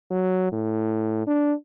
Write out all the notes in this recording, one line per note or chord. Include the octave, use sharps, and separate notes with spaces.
F#3
A2
D4